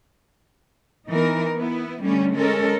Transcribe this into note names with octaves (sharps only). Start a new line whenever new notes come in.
E3 B3 D#4 A#4
B3 E4
D3 G3 A3 C#4
G#3 C#4 A4 A#4